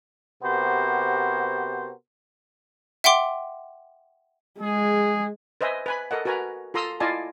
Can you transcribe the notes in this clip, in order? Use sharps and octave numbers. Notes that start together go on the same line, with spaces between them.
C3 B3 F#4 G4 A#4 C5
E5 F#5 G5 C6 D6
G#3 G#4
B4 C5 D#5 E5 G#5
B4 G#5 B5
A4 A#4 D#5 F#5
F#4 A#4 B4 G#5 A#5
F4 A4 A#5 C6 D#6 E6
E4 F4 D5 D#5 G#5 A5